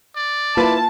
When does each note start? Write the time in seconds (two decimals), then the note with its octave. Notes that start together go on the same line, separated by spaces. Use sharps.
0.16 D5
0.57 A#3 E4 F4 B4 A5